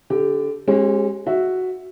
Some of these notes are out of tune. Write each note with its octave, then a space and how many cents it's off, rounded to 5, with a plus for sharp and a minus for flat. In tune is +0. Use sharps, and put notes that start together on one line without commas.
D3 -25 G4 +0
G#3 +0 C#4 -40 G4 -30
F#4 +0 E5 +0